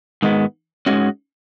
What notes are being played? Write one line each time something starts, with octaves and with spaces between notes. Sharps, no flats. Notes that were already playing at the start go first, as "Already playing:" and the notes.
G#2 D#3 G#3 B3
G#2 D#3 G#3 C#4 F#4